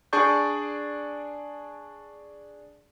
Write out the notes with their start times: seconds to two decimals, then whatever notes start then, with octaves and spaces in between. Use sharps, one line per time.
0.13 D4 G#4 D5 A5 C#6 G6